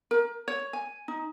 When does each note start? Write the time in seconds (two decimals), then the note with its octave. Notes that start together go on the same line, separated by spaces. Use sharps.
0.11 A#4
0.48 C#5
0.73 G#5
1.08 D#4